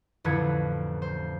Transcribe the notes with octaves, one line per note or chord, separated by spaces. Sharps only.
A1 F2 D3 B4 G#6 C#7
C5